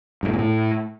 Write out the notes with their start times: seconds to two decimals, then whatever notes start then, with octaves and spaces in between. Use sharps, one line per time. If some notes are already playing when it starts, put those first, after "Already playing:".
0.23 G2
0.28 A2
0.33 A#2
0.38 A2